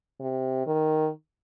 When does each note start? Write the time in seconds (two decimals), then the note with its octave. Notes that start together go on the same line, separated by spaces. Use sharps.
0.20 C3
0.67 D#3